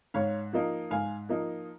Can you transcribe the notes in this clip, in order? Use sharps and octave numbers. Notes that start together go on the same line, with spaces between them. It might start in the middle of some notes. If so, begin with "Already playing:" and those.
G#2 C#5 F5
F3 A#3 D#4
G#2 F5 G#5
F3 A#3 D#4